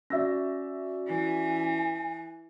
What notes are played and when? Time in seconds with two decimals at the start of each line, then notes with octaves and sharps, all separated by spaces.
0.10 C#4 F#4 D5 E5 E6 A#6
1.09 E3 G#5